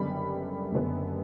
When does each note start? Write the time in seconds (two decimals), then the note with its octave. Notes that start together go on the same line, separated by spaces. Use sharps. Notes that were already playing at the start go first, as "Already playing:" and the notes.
Already playing: F#1 F#2 D3 G3 B3 B5
0.72 F#1 F#2 D3 G3 B3